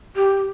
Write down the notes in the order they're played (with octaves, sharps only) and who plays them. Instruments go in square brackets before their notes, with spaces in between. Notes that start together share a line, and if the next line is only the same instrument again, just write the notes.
[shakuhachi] G4